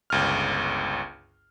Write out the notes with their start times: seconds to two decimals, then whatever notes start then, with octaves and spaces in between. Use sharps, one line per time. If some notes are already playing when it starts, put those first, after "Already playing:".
0.10 G1 C#2 F6